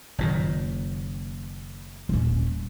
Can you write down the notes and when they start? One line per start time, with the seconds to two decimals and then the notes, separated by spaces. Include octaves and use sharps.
0.18 F#1 A#2 D#3
2.09 D#1 C#4